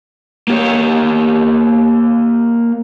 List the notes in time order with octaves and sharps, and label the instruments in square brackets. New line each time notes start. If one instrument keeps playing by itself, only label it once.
[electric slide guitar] A#3 G4 C#5